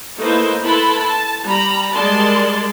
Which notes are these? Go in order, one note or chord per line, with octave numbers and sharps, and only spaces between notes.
A3 A#3 D#4 E4 B4 C5
E4 A4 B4 A5 B5 C6
A5
G3 A#5 B5
G3 G#3 A#4 D5 A5 C6